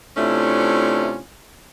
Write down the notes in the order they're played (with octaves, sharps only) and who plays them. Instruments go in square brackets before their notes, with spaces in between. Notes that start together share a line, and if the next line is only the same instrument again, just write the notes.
[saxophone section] C3 A3 C#4 D4 E4 F4